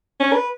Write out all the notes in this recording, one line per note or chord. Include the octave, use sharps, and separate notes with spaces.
C#4
B4